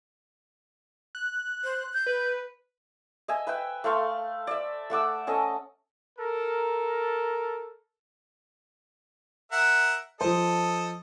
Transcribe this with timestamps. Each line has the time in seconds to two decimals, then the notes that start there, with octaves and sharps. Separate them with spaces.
1.15 F#6
1.64 C5
1.93 G6
2.06 B4
3.28 D#5 E5 G#5
3.47 B4 E5 G5
3.84 A3 F5 C6 C#6
4.47 D5 E5
4.90 A3 F#5 D6 E6
5.27 C#4 A4 D#5
6.19 A4 A#4
9.52 A#4 E5 F#5
10.21 F3 A4 C5 D#5